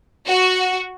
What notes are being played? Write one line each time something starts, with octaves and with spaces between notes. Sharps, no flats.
F#4